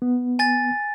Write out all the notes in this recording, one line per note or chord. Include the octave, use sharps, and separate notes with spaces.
B3
G#5 A6